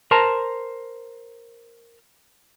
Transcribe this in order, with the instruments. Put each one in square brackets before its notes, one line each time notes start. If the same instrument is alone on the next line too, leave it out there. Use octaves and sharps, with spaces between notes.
[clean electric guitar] A#4 C5 A5 A#5